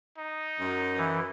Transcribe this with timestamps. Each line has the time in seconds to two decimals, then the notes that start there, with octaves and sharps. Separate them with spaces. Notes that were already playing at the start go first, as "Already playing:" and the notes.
0.18 D#4
0.59 F#2
0.97 E3